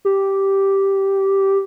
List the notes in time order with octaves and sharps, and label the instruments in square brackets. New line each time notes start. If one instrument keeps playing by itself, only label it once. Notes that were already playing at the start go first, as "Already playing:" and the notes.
[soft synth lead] G4